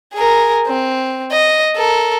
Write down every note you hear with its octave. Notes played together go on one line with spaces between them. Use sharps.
G#4 A#4
C4
D#5
A4 A#4